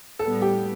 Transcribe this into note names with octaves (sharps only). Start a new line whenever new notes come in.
A2 G3 B3 A4
G4